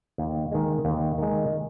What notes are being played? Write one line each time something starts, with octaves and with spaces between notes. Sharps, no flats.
D#2
D#3 G#3
D#2
D#3 G#3